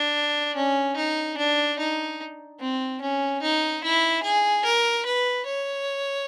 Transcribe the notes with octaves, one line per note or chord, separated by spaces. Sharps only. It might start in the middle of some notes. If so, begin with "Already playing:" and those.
Already playing: D4
C#4
D#4
D4
D#4
C4
C#4
D#4
E4
G#4
A#4
B4
C#5